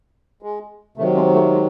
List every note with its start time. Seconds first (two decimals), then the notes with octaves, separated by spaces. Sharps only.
0.42 G#3
0.97 C3 D#3 F#3 A3
1.15 G#3 C4
1.34 A3
1.52 G#3